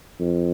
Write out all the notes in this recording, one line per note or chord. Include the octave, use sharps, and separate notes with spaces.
F2